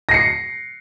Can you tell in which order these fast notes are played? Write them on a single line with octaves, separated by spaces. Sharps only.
A#6 C7 C#7